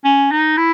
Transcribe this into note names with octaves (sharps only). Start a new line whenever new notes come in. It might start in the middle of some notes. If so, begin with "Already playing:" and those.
C#4
D#4
E4